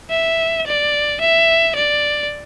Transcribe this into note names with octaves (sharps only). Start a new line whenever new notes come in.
E5
D5
E5
D5